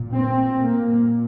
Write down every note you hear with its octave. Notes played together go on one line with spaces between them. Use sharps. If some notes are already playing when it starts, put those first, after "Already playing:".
Already playing: A#2
C4
A#2 A#3